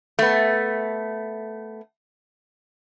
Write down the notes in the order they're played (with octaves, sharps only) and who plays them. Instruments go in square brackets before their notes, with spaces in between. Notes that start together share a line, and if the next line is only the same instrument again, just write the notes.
[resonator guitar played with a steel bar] A3 B3